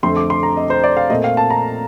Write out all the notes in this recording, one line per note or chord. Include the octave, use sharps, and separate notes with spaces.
F2 D3 A3 C4 C6
D6
C6
A#5
D#5
C5
D5
F5
A#2 A3 C4 D#5
F5
A5
A#5